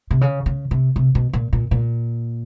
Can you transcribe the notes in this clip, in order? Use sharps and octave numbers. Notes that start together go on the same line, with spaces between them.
C3
C#3
C#3
C3
C3
B2
A#2
A#2
A#2